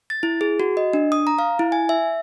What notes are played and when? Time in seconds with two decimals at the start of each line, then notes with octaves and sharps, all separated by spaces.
0.10 A6
0.23 E4
0.41 G#4
0.60 F#4
0.77 D#5
0.93 D4
1.12 D#6
1.27 A#5
1.39 F5
1.59 E4
1.72 G#5
1.89 E5